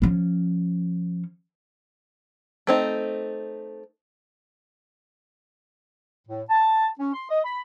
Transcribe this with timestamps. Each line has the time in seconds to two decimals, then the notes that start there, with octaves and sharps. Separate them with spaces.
0.02 F3 C#4
2.67 A3 C4 D#4
6.27 A2
6.50 A5
6.99 C#4
7.14 C6
7.30 D#5
7.44 B5